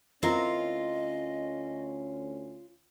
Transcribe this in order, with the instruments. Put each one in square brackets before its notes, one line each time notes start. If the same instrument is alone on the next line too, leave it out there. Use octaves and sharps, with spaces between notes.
[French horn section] D2 C#4 [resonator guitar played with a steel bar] C4 E4 A#4 [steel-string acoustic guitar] F4 [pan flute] D#5